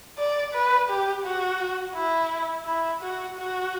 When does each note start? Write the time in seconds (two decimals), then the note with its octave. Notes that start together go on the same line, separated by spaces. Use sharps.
0.18 D5
0.54 B4
0.89 G4
1.24 F#4
1.96 E4
2.66 E4
3.01 F#4
3.38 F#4